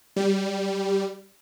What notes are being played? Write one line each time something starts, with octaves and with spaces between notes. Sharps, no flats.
G3